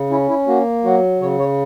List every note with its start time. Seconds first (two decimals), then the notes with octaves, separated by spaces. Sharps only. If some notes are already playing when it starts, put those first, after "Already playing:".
Already playing: C#3
0.10 C#4 E4
0.29 E4
0.47 A#3 F#4
0.84 F#3 F#4
1.20 C#3 C#5
1.39 C#5